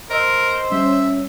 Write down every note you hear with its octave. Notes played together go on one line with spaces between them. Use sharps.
A#4 C5 D#5 E6
G3 C#4 E5